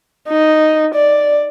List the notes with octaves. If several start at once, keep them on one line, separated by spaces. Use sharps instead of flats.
D#4
D5